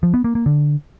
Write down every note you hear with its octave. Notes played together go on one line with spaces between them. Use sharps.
F3
B3
A#3
A#3
D3